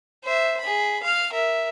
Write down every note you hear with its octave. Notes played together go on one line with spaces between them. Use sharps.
C5 E5
G#4 B5
F5 F6
A#4 E5